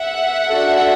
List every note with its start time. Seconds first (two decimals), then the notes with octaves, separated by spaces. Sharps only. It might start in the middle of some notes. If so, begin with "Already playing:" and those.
Already playing: E5 F#5
0.48 D4 F#4 A4